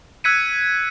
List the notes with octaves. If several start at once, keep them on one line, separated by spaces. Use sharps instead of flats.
E6 F#6 G#6 B6 C#7 D#7